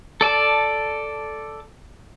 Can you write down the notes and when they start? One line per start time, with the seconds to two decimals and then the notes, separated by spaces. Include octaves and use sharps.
0.21 A4 D5 A5